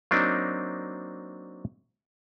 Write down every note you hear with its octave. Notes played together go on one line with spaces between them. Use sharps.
F#3 A#3 C4 D4 D#4